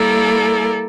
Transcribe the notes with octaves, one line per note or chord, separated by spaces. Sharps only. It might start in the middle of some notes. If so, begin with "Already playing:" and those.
Already playing: G3 A#3 E4 A4 A#4 D5